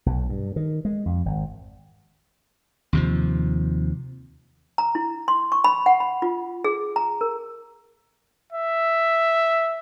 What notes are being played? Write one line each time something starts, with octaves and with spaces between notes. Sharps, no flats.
B1
G2
D#3
G#3
F2
G#1
D#2 C3 F3
A#5
E4
C6
C#6
B5
F#5
B5
F4
G#4
A#5
A#4
E5